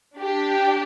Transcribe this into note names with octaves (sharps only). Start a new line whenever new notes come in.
D4 G4